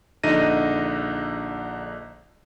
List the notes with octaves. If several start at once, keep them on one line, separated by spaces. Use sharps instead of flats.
A#1 D3 D#4 D#5 A#6 D#7